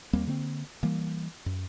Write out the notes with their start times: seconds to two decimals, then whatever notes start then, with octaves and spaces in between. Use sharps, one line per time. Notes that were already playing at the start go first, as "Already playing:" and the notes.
0.13 D#2 G3 A#3 C4
0.27 D3 A#3 C4
0.83 E3 G3 A#3
1.46 F#2